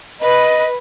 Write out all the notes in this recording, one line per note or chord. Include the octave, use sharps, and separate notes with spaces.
B4 D#5